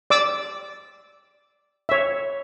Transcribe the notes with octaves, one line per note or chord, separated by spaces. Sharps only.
D5 D6 E6
C#5 E5